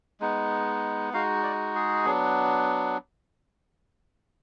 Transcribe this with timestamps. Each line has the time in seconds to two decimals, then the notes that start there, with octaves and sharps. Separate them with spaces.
0.20 G#3 B3 D#4
1.13 G#3 D#4 F#4 F5
1.43 D5
1.75 G#4
2.05 F#3 B3 D4